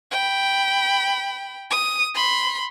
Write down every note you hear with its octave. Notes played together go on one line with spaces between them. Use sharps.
G5 B5
D#6
B5 C6